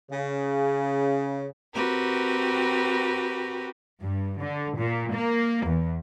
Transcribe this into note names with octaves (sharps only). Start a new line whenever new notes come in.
C#3
C4 F#4 G4 A#4 B4
G2
D3
A#2
A#3
E2